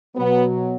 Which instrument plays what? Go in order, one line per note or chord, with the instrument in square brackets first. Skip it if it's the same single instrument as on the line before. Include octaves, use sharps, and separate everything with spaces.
[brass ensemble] B2 F#3 B3